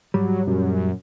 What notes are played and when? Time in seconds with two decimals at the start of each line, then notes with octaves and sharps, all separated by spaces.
0.14 G#2 F#3 G3
0.47 F#2 A#2 F#3